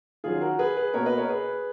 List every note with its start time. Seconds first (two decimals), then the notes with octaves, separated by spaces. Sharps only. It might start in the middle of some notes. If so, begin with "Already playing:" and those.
0.24 D#3 F#3 C#4 F4 G#4
0.41 F#4 A#4
0.59 G#4 B4
0.77 G#4 B4
0.94 B2 A#3 C#4 A#4 C#5
1.06 B4 D#5
1.18 A#4 C#5
1.29 G#4 B4